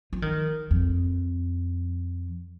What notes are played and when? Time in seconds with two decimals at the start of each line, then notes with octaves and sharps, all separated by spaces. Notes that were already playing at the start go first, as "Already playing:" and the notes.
0.13 F3
0.22 D#3
0.71 F2